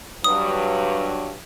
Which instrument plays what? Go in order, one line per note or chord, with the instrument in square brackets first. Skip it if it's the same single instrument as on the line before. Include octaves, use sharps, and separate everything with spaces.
[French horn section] G2 F#3 [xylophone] D#6